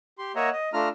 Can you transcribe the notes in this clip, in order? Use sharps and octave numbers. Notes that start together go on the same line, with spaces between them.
G4 C6
A#3 C#5 D#5 E5 F#5 A#5
D#5
A3 D4 F4 A#5 F6